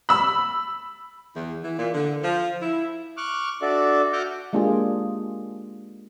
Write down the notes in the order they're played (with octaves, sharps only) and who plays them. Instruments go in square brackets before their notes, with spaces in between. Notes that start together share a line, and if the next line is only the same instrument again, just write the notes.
[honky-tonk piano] B5 E6
[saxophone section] E2
E3
A#2
D3
F3
E4
[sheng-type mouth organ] C#6 D6 F6 F#6
D4 F#4 A4 D5 E5
F#4 E5 F#5 D6 F6 G6
[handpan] G#3 A#3 D4 F4 G4 G#4